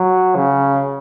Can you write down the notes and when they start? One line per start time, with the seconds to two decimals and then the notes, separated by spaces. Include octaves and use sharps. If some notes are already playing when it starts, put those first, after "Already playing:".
Already playing: F#3
0.35 C#3